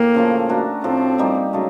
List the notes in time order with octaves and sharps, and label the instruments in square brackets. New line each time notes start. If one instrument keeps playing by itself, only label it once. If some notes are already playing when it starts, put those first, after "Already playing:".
Already playing: [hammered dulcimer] A2 G4 [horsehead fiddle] A#3
[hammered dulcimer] C#3 F3 A3
A3 D4 F#4 A#4
[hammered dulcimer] A2 F3 A3 [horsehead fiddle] C4
[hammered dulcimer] G3 A#3 D#4 G4
C#3 F#3 A3